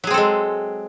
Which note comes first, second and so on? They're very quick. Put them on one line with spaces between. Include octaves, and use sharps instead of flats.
F#3 G#4 C4 A4 G#3